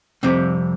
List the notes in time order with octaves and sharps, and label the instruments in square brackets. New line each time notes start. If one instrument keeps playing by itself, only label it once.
[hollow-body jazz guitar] F2 C3 G3 C4